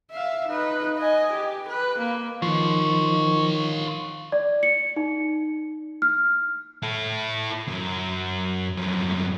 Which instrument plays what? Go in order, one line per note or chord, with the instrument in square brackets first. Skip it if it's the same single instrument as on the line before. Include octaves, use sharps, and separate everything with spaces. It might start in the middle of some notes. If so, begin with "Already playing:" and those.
[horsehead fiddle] E5 F5
D#4 B4
D#5 G#5
G4
B4
A#3
[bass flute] D#3 [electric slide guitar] F3 [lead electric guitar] F4 C#5
[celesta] D5
C#7
D#4
F6
[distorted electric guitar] E4 A4
F#2
F#2 F3